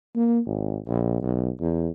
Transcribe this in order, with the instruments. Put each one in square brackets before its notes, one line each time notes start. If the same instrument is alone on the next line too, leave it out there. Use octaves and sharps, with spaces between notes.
[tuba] A#3
G#1
A#1
B1
E2